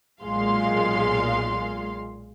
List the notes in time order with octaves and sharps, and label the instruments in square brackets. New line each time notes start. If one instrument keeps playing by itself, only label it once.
[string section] B1 A#2 G#3 F5 C6